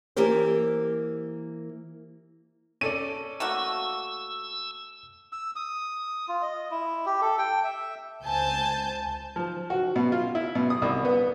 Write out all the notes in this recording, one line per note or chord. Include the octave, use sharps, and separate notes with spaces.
E3 A#3 G4 A#4 C5
C#4 A4 D5 D#7
A3 A#3 F#4 E6
E6
D#6
F4
D#5
E4
G4
A4
G5
E5
C#2 C5 G#5 A5 G6
F3
F#4
B2
F4
E4
B2
D#6
C2
B3